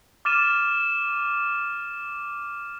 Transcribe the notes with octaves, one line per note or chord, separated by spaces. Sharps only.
D6 F6 A6 D#7 E7